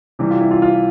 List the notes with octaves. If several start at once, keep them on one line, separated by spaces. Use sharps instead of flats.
C3 E3 G3 G4
F4
E4
F4
F4